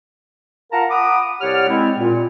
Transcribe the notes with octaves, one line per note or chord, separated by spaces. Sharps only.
F4 A#4 F5 F#5 A5 A#5
F#5 B5 D6 D#6
C2 G4 C#5 D5 F#5 F6
G#3 C4 E4
A#2